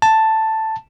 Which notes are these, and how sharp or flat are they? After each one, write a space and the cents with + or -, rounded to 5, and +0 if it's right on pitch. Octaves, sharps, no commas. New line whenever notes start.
A5 +5